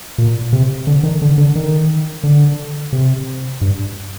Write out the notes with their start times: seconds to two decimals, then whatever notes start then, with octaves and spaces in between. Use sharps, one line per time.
0.18 A#2
0.53 C3
0.87 D3
1.03 D#3
1.22 D3
1.38 D3
1.55 D#3
2.23 D3
2.93 C3
3.61 G2